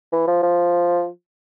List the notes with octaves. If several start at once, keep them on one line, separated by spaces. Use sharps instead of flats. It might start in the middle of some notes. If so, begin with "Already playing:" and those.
E3
F3
F3